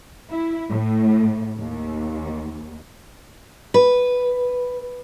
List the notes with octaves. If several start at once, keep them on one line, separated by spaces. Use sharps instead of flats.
E4
A2
D#2
B4